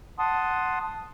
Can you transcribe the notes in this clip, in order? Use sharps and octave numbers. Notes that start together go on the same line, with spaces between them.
F#5 A5 C6 D#6